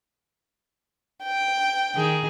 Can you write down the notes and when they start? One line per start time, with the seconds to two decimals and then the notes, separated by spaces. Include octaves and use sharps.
1.24 G5
1.95 D#3 G#4